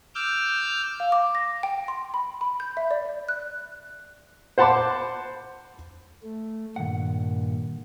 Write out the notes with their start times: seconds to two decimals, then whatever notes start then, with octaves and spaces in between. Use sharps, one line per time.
0.15 D6 E6 F6 G6
1.00 F5
1.12 D6
1.35 A#6
1.63 G5
1.88 C6
2.14 B5
2.41 B5
2.60 G6
2.77 E5
2.91 D5
3.05 D5
3.28 F#6
4.58 C5 F#5 A5 B5 C6 D6
6.23 A3
6.76 G2 A#2 D#3 F#5